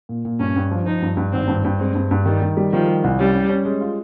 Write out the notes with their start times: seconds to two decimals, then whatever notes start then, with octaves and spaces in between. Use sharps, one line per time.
0.09 A#2
0.25 A#2
0.39 G2 C#4
0.56 G2
0.71 F3
0.86 F3 D#4
1.02 G2
1.17 G2
1.32 G#1 C4
1.48 G2
1.65 G2
1.79 G#3 C4
1.94 G2
2.11 G2
2.26 D#3 G3
2.42 D#3
2.57 G3
2.73 D#3 F3
2.88 G3
3.04 C2
3.19 G3 C#4
3.34 C#4
3.49 C#4
3.65 G#3
3.81 F4